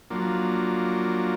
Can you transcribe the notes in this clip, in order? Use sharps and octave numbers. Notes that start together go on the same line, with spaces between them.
F3 F#3 A#3 D4